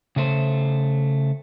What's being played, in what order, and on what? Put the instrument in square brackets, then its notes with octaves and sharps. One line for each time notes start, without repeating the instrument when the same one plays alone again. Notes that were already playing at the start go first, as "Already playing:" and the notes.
[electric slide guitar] C#3 A3 C5